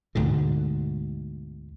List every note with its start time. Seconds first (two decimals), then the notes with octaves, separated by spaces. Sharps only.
0.15 D2 G#2 B2 D3